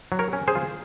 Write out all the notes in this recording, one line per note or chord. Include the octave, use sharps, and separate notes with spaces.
F#3
A#4 C#5
C#4
G#4 C5
F4